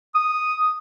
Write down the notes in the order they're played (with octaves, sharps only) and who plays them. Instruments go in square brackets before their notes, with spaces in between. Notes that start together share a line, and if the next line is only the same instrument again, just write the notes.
[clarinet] D#6